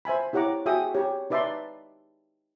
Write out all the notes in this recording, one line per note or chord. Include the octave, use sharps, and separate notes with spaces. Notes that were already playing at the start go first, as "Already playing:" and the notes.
C5 E5 G#5 B5
E4 G4 C#5 F#5 A#5 D6
F#4 G#4 E5 G5 D#6
G4 C#5
D#4 B4 D5 E5 A5 C6